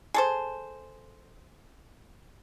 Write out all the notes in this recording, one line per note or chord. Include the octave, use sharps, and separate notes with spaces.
G#4 A4 C5